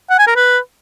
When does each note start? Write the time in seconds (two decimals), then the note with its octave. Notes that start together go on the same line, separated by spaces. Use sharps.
0.10 F#5
0.19 G#5
0.27 A#4
0.36 B4